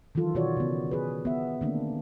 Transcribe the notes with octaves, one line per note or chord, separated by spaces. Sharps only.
D#3 E3 F#3 F4 A4
B2 D#3 F4 F#4 C#5 D5
C#3 B3
G#4 B4
B3 E5
D3 D#3 A3 A#3 C4 D4